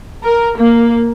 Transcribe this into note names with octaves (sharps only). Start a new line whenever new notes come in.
A#4
A#3